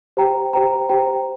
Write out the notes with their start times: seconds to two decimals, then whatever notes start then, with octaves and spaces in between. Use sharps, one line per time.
0.17 G4 C5 G5 A#5
0.53 G4 C5 G5 A#5
0.89 G4 C5 G5 A#5